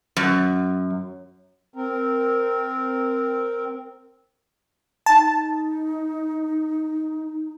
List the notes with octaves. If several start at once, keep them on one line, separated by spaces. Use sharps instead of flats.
F#2
C4 A#4
D#4 A5